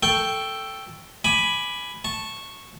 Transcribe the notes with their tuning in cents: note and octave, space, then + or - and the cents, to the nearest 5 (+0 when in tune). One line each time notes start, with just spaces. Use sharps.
A4 +0 G5 +0 C#6 +0
G#5 +10 B5 +0 D6 +20
A5 +0 C#6 -10